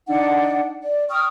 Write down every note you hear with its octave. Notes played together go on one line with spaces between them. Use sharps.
D4 D#4 F#5
D5
G5 C#6 D#6 F6